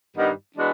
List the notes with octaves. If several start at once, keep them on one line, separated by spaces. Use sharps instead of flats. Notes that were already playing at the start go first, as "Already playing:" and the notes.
G2 D#3 G3 B3 D#4
E3 G#3 B3 D4 F#4